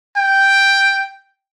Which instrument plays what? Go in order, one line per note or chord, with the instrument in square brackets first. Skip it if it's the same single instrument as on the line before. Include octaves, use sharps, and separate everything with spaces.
[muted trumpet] G5